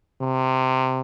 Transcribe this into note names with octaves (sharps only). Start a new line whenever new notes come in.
C3